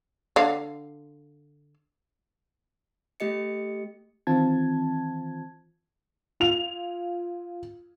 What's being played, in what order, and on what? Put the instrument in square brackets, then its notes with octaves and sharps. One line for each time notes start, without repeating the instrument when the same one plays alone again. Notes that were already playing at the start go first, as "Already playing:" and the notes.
[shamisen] D3 F5
[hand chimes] A3 G4 D#5 C#7
[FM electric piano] D#3 E3 C4 F4 A5 G#6
[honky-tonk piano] F4 F7